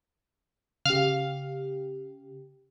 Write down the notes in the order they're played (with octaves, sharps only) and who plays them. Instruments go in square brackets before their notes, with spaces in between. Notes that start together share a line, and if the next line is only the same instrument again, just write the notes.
[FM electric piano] C#3 G4 [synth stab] F5